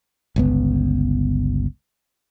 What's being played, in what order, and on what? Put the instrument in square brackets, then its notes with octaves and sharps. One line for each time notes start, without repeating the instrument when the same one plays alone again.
[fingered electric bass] G1 C#2 B3